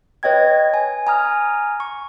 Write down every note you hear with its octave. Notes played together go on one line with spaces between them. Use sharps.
B4 C#5 D#5 G5 G#6
G#5
G#5 A#5 D#6 F6
C#6